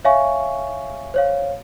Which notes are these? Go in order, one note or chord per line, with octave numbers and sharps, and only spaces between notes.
C#5 E5 F5 G#5 C#6
C5 C#5 F5